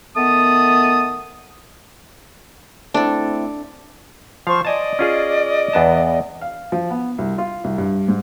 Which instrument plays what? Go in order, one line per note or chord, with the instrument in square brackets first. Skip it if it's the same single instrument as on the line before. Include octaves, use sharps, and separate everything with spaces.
[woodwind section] D#3 A3 B3 A5 D#6
[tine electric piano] A3 C4 E4 [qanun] D4 A4
[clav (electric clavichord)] F3 F5 [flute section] C5 C#6
[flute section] D5 D#5 [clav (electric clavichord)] G#5 A5
[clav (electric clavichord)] C#4 F4 G#4
E2 B3 A5
[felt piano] F5
F3
B3
C2
F4
C2
G2
G#2